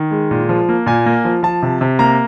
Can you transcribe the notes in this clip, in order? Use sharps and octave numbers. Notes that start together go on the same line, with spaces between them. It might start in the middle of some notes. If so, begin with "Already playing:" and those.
Already playing: D#3
G#3
A#2
F3
A#3
A#2 G#5
A#3
F3
F3 A5
C3
C3
A#3 A#5